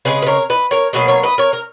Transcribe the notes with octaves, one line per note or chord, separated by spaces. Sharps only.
C#3 G#3 G#4 B4
B4
A#4 C#5
B4 D#5
A#4 C#5
B2 F#3 A#3 G#4 B4
A#4 C#5
B4 D#5
A#4 C#5
A#4